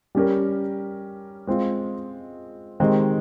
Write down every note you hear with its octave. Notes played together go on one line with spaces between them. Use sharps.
G3 C#4 G4 A#4
G#3 C4 F4
D#3 G#3 C4 G4